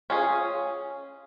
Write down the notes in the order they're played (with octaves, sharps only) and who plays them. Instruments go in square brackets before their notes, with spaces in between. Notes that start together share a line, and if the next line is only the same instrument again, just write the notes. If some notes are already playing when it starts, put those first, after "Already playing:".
[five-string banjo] C#4 F4 G#4